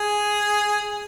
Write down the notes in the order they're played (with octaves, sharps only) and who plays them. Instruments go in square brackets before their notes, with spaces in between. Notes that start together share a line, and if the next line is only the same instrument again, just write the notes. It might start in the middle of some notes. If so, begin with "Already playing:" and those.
Already playing: [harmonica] G#4